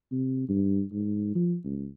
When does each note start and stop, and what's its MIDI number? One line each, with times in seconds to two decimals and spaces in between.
0.12 0.45 48
0.49 0.82 43
0.92 1.32 44
1.35 1.57 53
1.64 1.87 37